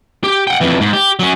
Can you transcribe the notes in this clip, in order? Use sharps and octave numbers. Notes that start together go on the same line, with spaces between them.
G4
F#5 G5
F2 E3
G#2
G4
F#3 C#4